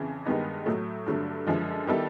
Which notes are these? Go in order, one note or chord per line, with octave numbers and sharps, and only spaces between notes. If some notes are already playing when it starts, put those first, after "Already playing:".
Already playing: F2 C#3 E3
G2 D#3 G#3 B3 D#4
A2 F#3 A3
G2 D3 F#3 A3
F#2 D3 F3 G#3
D#3 G3 B3 E4 A4